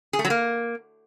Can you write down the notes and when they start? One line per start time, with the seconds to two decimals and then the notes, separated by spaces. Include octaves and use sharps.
0.13 G#4
0.19 A3
0.25 F#3
0.30 A#3